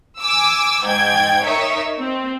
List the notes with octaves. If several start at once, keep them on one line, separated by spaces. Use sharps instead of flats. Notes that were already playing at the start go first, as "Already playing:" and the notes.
G#5 D6 E6
G#2 G5 G#6
D#4 A#4 C#5 E5
C4